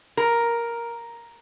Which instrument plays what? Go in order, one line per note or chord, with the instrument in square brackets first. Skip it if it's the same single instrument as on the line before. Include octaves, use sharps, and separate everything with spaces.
[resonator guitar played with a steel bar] A#4